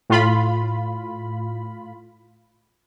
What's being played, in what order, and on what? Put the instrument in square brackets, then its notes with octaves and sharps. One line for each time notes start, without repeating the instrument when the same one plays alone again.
[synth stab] A2 F4 B5